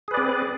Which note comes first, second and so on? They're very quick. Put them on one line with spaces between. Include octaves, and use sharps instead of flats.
G#4 B4 D5 C4